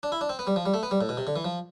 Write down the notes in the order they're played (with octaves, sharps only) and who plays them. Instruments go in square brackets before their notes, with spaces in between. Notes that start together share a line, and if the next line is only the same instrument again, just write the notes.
[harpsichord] D4
E4
D4
C4
B3
G3
F3
G3
A3
B3
G3
A2
B2
C3
D3
E3
F3